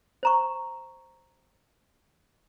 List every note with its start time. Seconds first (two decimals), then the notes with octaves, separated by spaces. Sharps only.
0.23 C5 A#5 C#6